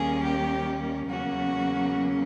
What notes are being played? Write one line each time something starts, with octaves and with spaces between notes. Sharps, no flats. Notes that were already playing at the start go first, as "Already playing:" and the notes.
Already playing: D#2 D#3 G3 A#3 C#4 G#4
G4
E2 C#3 F#3 A#3 C#4 F#4